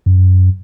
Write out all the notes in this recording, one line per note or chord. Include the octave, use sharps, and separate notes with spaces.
F#2